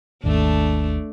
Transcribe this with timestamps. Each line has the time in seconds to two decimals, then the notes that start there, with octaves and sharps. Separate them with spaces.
0.24 G#1 D#2 A3 D4